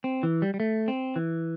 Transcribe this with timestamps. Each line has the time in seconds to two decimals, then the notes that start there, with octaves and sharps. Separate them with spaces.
0.04 C4
0.23 E3
0.42 G3
0.54 G3
0.60 A3
0.88 C4
1.16 E3